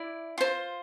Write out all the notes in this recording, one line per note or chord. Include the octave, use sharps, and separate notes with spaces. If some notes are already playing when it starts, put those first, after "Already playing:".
Already playing: E4 D5
F4 C5